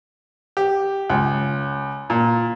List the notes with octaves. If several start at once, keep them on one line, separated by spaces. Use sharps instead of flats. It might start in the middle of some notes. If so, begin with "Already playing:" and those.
G4
C#2
A#2